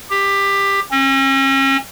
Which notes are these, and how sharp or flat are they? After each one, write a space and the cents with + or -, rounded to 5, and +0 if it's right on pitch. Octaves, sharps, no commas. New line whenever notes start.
G4 +15
C#4 -40